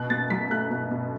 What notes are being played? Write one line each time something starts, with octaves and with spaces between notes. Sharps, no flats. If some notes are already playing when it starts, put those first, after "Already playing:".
Already playing: B2 F#6
B2 A6
F#3 B6
A3 F#6
B2
B2